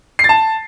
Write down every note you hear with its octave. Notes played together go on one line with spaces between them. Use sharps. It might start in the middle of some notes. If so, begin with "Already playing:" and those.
C7
A6
A5